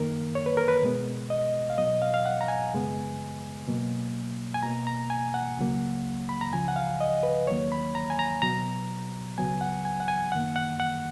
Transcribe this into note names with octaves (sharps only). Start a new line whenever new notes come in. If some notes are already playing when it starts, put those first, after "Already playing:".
Already playing: F#2 D#3 A#3 A#4
C#5
B4
A#4
B4
B2 G#3 B3
D#5
F5
B2 F#3 B3 D#5
F5
F5
F#5
A#5
G#5
F#2 C#3 G#3 B3
B2 F#3 A#3
G#5
B2 A#3 A#5
A#5
G#5
F#5
C#2 C#3 F#3 A#3
B5
A#5
C#2 C#3 F3 G#5
F#5
F5
D#5
B4
D#2 D#3 F#3 A#3 C#5
B5
A#5
G#5
A#5
B2 F#3 B3 A#5
C#2 C#3 F#3 B3 G#5
F#5
G#5
F#5
G#5
F#2 D#3 A#3 F#5
F#5
F#5